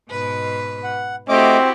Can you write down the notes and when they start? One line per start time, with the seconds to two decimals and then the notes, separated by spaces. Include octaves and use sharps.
0.10 G#2 B2 B4
0.84 F#5
1.29 A3 C4 E4 F#4 G4 D#5 D6